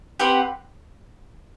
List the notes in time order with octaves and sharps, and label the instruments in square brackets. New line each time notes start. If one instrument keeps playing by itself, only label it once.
[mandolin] C4 G4 B4 F#5